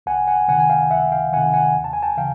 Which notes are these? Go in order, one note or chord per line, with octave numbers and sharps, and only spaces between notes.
C#2 F#5 G#5
F#5 G#5
C3 D#3 F#5 G#5
G#5
F5 G5
C#2 E5 F#5
F5 G5
C3 D#3 F#5 G#5
F#5 G#5
D#2
A5
G#5
G5 A5
C#3 E3 F5 G5